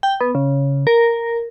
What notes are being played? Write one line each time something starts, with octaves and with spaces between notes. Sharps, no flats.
G5
B3
C#3
A#4